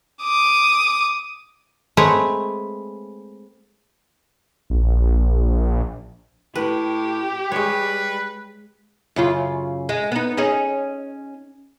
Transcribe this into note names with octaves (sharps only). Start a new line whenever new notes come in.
D6 D#6
G#3 A3 C4 B4 C#5 A#5
A#1
A2 G4 B4
G3 G#3 B4 C#5
F#2 C#3 F4
G#3
B3 D#4
C#4 D#4 G#4